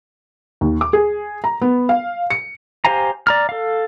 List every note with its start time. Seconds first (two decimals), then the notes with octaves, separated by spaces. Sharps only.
0.61 D#2
0.81 D6
0.93 G#4
1.44 A#5
1.62 B3
1.89 F5
2.30 C#7
2.85 G4 C5 F5 G#5 A#5
3.27 D5 A#5 F6
3.49 A4 F5